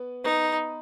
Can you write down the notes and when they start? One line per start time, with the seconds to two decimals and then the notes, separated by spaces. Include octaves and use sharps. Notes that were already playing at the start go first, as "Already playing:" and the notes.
Already playing: B3 B4
0.24 B3 D#4 B4